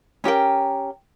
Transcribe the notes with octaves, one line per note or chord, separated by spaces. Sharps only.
C#4 G4 A#4 G5